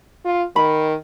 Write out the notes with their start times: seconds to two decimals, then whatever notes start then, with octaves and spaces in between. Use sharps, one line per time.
0.25 F4
0.56 D#3 B5